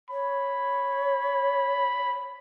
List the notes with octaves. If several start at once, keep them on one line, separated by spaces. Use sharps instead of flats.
C#5 B5